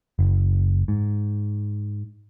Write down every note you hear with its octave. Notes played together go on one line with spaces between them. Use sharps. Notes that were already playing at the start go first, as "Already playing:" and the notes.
F#1
G#2